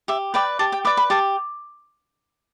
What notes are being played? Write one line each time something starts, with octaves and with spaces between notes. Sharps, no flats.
G4 E5
B4 D5 G5
G4 A5
G5
B4 D5 D6
B5
G4 A5